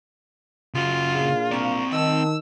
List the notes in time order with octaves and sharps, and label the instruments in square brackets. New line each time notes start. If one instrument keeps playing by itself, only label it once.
[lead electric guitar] C#3 F#4 [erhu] F4
[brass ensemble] A#2 D4 F5 [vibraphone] G#4
[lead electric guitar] C4 D5 [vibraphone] A#5 C#6
[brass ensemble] D#3 [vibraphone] D#5 A5 [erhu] E6